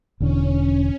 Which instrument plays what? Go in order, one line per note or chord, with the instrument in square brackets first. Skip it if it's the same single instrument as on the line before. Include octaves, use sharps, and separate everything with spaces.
[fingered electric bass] E1 E2 D3 [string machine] C#4